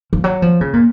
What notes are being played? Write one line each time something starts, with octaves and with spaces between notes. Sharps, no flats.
F3
F#3
F3
C#3
A#2